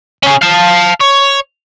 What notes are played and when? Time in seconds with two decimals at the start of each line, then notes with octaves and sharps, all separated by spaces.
0.23 C#4 G#4
0.42 F5 A5
1.01 C#5